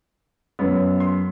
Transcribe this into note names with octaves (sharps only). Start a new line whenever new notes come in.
F#2 F#3 B3
C6